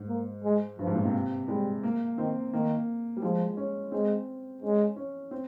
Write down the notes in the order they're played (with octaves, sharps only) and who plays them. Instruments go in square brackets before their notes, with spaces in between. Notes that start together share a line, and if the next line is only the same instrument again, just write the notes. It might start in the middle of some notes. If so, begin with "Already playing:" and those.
Already playing: [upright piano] G#2
[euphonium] A#3
G#3
[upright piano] G2 [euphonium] F3
[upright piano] G#2
A#2
C3
[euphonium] G3 [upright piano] G#3
[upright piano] A#3
[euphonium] D#3 [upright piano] C4
[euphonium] D#3 [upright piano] A#3
[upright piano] G3
[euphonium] F3 [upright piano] G#3
[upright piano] C#4
[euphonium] G#3 [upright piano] C4
[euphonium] G#3 [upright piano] C#4
[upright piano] C#4
C4